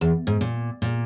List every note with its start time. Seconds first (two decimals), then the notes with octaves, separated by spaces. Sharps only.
0.01 E2
0.27 G#2
0.41 A#2
0.82 A#2